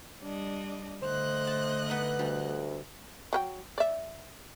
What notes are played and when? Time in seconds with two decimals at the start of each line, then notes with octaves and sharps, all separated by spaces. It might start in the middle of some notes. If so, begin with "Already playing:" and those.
0.20 G3 D4 D#5
1.02 D3 A3 C5 D#5 F#6
1.47 A5
1.89 B3 D#4
2.19 D2 G3
3.33 F#3 A#4 G5
3.78 D5 E5